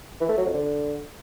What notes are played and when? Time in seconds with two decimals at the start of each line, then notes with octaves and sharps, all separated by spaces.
0.21 E3
0.29 A3
0.37 F#3
0.45 F2
0.53 D3